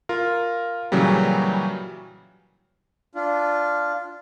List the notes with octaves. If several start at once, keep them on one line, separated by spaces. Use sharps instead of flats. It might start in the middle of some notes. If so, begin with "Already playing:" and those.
F4 A#4
A#2 C#3 E3 F#3 G3
D4 F4